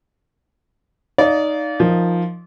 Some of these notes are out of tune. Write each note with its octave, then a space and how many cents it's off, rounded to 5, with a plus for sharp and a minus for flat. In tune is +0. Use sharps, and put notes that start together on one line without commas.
D#4 -5 D5 -30 F5 +0
F3 +0 D#4 +0 A#4 +0